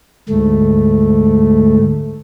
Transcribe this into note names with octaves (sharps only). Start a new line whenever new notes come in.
D2 G#2 A3